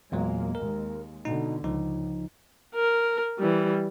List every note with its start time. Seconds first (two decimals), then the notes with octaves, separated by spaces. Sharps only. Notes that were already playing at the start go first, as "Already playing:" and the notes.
0.12 E2 A#2 F#3 G#3 A#3
0.55 D#2 G#3 A#4
1.25 B2 D3 D#4
1.64 C#2 F3 D#4
2.75 A#4
3.39 E3 G3